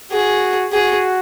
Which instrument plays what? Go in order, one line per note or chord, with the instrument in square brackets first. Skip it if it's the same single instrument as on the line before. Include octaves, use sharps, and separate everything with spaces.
[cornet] F#4 [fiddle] G#4
[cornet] F#4 [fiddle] G#4